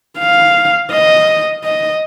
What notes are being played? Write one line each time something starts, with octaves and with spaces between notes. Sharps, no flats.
F5
D#5
D#5